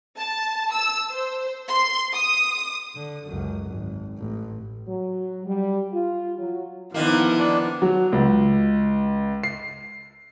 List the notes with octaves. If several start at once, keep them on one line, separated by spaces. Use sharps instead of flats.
A5
E6
C5
C6
D#6
D3
C#2 F#2
G#1
A1
F#3
G3
F4
F#3
D3 D#3 F3 A#3 B3 D#4 E4
D4
F#3
C#2
C7